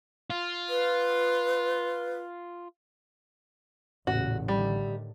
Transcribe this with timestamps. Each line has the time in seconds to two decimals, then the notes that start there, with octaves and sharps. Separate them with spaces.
0.30 F4
0.70 B4
4.07 A1 E2 A#2 C#3 F#4
4.48 A2 D3 D#3 G3